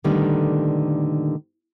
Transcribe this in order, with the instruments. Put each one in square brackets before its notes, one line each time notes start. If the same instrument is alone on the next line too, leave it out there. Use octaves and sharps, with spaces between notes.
[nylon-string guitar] A#2 D3 D#3 G3 A3 B3